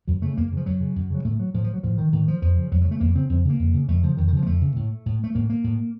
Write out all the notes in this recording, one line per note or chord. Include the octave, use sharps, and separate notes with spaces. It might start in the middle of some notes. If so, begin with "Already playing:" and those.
F#2 F#3
C#3 A3
F#2 A#3
C#3
F3
F#2 F#3
C#3
F#2
C#3 F#3
A2 A3
F#3
A2 F3
F3
F#3
A2 F3
D#3
A2 D#3
F3
F2 F3
C#3
F2 F#3
F#3
C#3
A3
F2 A#3
C#3 C4
F2 C4
C#3 A#3
F2
C#3
F2 A3
C#3 F3
F2 D#3
D#3
C#3 F3
A#3
F2 A3
C#3
A2
A2
A3
A2 A#3
A#3
A2